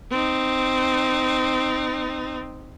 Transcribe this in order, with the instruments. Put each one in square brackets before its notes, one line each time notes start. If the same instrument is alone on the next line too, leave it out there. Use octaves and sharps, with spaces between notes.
[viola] C4 D#4